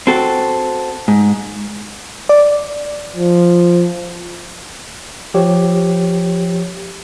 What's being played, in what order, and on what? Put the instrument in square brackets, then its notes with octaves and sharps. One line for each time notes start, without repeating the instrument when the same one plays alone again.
[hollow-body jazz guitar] C4 F#4 A4
G#2
[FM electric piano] D5
[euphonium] F3
[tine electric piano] F3 G4 C#5